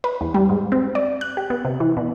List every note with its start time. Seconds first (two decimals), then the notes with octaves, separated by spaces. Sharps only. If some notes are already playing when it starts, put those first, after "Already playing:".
0.04 B4
0.21 E2
0.34 G3
0.49 G#2
0.72 C4
0.95 D5
1.21 F#6
1.37 G4
1.50 B3
1.65 C3
1.80 E3
1.97 B2